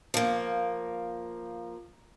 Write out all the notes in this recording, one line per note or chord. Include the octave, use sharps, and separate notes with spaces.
F3 A#3